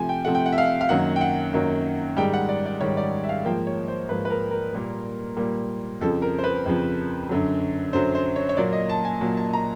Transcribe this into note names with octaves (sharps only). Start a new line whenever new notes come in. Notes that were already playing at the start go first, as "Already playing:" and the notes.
Already playing: C3 F3 A3 G#5
G5
C3 F3 A3 F#5
G5
F#5
E5
F5
F5
F#2 D#3 F#3 A#3 F#5
G5
F#5
F#2 D#3 F#3 A#3
G#2 D#3 G3 G5
F#5
D5
D5
G#2 D#3 G3 C#5
D5
E5
F5
G#2 F3 A#3 G5
C#5
C5
G#2 F3 A#3 B4
B4
A#4
A#4
A#2 G3 A#3
A#2 G3 A#3
F2 C#3 F3 A4
A#4
C5
B4
F2 C#3 F3
F#2 D3 F#3
F#2 D3 F#3 C5
C5
C#5
C#5
A#2 F#3 A#3 D5
D#5
A5
G#5
A#2 F#3 A#3
A5
A#5